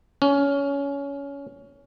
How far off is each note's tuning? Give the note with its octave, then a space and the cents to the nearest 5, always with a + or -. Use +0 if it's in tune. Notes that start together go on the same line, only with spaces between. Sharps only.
C#4 +20